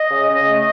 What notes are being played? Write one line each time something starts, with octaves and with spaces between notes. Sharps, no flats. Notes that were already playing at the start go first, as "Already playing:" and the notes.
Already playing: D#5
C#3
C#3
A3